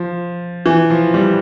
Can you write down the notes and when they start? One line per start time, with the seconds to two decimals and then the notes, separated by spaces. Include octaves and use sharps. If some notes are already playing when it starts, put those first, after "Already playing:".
Already playing: F3
0.66 E3
0.90 F3
1.14 G3